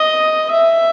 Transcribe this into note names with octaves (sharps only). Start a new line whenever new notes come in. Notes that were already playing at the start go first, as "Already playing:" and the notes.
Already playing: D#5
E5